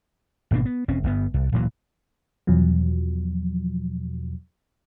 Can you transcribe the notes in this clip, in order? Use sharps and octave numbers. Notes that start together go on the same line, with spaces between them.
G#1 B2 A#3 D4
B3
E1 C4 C#4
G1 G2 B3
C2
D1 A#2 E3 F#3
E2 B2 F3 F#3